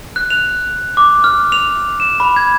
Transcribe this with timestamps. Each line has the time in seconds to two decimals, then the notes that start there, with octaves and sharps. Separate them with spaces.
0.16 F#6
0.30 F7
0.97 D6
1.24 F6
1.52 F7
2.00 E7
2.20 B5
2.36 G#6